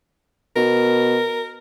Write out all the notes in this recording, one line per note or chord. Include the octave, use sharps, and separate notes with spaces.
B2 A#4